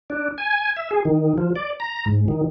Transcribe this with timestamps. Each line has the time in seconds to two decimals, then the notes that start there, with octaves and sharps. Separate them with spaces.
0.10 D4
0.38 G#5
0.77 E5
0.91 G#4
1.05 D#3
1.38 F3
1.56 D5
1.80 A#5
2.06 G#2
2.28 D#3